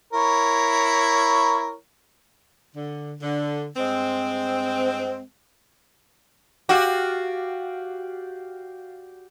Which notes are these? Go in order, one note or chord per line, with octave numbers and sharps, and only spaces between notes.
E4 A#4 C#5
D3
D3
G2 G#3 C4
F#4 G4 D5 F5